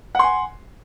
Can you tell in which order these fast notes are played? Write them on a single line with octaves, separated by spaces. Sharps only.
F#5 C6 G#5